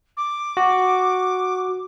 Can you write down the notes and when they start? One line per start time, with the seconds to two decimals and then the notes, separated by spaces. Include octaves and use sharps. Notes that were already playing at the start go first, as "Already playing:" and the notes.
0.17 D6
0.57 F#4